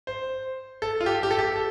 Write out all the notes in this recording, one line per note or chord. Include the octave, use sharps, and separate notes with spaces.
C5
A4
F4
G4
G4
A4
G4
A4